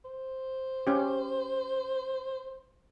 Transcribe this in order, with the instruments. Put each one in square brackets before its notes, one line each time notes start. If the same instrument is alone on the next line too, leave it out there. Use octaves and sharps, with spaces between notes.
[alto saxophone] C5
[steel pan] C#4 G4